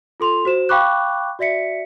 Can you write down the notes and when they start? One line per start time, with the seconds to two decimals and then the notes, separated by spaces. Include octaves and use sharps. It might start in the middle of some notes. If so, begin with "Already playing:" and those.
0.20 F4 A4 C6 F7
0.45 F#4 C5 E7
0.69 F5 G5 B5 C#6 D6 F#6
1.39 F#4 D5 E5 B6 C#7